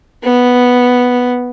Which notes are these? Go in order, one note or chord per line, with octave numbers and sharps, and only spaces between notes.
B3